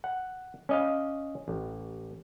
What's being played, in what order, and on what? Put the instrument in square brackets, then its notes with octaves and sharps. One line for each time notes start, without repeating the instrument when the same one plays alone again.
[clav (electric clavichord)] F#5
C#4 D#5 F5
A1